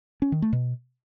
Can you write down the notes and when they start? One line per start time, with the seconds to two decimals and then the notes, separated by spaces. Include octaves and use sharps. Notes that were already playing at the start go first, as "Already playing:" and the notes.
0.22 C#4
0.32 D#3
0.42 A3
0.53 B2